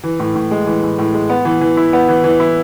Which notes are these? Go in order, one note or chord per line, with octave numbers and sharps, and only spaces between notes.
E3
A2
A2
G#3
E3
A2
A2
G#3
B3
E3
E3
E4
B3
E3
E3
E4